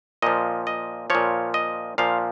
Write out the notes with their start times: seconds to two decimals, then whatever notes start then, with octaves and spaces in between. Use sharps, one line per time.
0.22 A#2 F3 D#5
0.67 D#5
1.10 A#2 F3 C#5
1.54 D#5
1.98 A#2 F3 F5